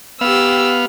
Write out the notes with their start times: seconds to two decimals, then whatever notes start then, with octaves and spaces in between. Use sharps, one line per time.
0.21 B3 G4 F5 E6